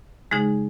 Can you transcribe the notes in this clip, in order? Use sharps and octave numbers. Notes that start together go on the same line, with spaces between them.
C#3 G#3 D#4 G#4